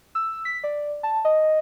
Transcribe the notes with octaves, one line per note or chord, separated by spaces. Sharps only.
E6
B6
D5
A5
D#5